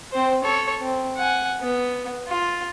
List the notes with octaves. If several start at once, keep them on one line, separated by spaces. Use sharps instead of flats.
C4 C5
A4 C#5
C4
F#5 G#5
B3
F4